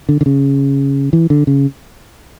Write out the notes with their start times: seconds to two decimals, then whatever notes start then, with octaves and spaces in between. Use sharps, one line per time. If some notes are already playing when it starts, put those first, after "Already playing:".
0.09 D3
0.21 D3
0.26 C#3
1.13 E3
1.30 D3
1.47 C#3